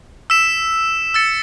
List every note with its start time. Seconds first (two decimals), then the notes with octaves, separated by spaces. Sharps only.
0.30 E6 B6 E7
1.14 E6 A6 C#7